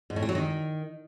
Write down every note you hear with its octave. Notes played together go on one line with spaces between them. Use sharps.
G#2
A2
C4
F#3
D#3